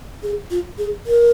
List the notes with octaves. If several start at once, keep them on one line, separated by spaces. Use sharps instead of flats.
G#4
F4
G#4
A#4